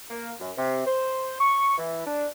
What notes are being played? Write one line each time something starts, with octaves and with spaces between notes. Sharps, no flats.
A#3
F#2
C3
C5
C#6
E3
D4